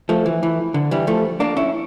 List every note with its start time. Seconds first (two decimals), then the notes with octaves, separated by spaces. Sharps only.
0.09 F3 A3
0.26 E3
0.43 E3
0.74 D3
0.91 E3 G3
1.07 F3 A3
1.40 A#3 D4
1.57 C#4 E4